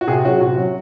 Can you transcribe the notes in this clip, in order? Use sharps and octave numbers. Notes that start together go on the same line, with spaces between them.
F#4
C3 G#4
F#3 C#4 F#4
C3 F#4
F#3 C#4